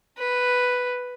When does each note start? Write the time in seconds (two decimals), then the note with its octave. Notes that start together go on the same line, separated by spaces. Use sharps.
0.18 B4